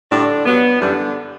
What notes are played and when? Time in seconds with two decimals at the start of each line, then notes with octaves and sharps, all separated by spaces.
0.11 A2 D3 G3 D4
0.46 G2 F#3 B3
0.80 F#2 D3 E3 G3 D4